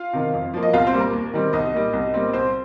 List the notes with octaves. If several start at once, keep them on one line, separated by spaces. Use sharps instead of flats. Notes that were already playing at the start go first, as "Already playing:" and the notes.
Already playing: F4 F5
C3 D#3
F2
F3 A#3
D#5
C2 F4 F5
C4 C5
A#2 G3 A#3
A#4
D#2
D#3 G3 C4
C2 D#4 D#5
A#2 G3
C2
A#2 G3 C4
C2 C4 C5